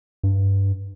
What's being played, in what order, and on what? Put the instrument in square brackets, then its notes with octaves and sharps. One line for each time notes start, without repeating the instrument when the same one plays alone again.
[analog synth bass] G2